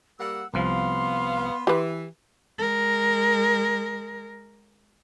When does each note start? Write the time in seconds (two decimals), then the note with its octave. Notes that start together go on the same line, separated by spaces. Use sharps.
0.19 G3 A#3 F#5 E6
0.54 C2 F3 B3 F5 C6
1.67 E3 G4 B4
2.58 G#3 A#4